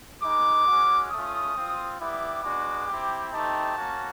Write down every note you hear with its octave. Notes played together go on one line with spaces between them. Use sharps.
G#3 B3 D#4 D6
G#3 C#4 F#4
A3 C#4 F4 D#6
C4 F4
G3 B3 E4 G4 D6
G#3 B3 D4 F#4 D6
C4 E4 G4
A3 C4 D#4 G4 A5
A#3 C#4 F#4